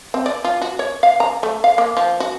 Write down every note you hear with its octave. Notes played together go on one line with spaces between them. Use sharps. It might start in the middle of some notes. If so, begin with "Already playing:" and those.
C4
D5
F4
F#4
C#5
F5
A#5
A3
F5
A#3
F3
F#4